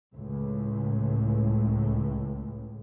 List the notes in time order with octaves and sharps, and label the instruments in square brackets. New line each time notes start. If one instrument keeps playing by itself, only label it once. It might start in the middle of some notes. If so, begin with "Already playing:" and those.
[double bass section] C#2 A2